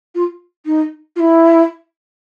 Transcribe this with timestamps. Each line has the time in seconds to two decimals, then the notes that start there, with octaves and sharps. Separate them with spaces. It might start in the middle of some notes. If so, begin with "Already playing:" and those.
0.15 F4
0.65 D#4
1.16 F4
1.19 E4